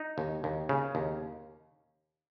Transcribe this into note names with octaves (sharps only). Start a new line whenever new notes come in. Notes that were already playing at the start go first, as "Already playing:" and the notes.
Already playing: D#4
D#2
D#2
C#3
D#2